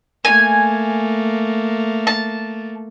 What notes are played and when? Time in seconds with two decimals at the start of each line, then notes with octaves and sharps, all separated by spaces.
0.25 A3 A#3 G#5
2.07 A5